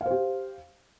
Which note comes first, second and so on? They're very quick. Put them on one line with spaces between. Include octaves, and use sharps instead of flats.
F5 C5 G4